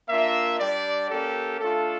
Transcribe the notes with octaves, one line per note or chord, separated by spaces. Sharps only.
A#3 D4 F4 E5
G3 D4 G4 D5
A#3 C#4 G4 A4
A3 D4 F4 A4